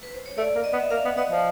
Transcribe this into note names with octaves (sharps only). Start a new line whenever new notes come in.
B4
C5
C#5
A3 D5
A#3
D#5
B3
E5
A#3 F5
B3
B3 D#5
F3